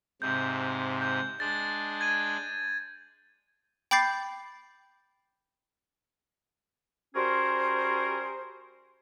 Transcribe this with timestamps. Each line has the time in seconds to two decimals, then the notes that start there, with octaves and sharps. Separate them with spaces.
0.22 G#2 C3 G6
1.02 G6
1.40 G#3 D4 A6
2.01 G#6 D#7
3.91 G5 B5 D6 G6 A6 C7
7.15 G3 C#4 F#4 G#4 A#4 C5